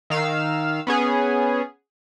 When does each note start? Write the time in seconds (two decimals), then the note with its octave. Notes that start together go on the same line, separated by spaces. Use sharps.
0.10 D#3 F5 E6
0.87 B3 C#4 G#4